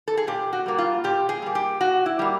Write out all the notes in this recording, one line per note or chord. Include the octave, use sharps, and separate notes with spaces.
A4
G#4
A#2 G4
F#4
G3 A#3
F4
A#2 G4
G#4
G3 A#3
G4
A#2 F#4
E4
G3 A#3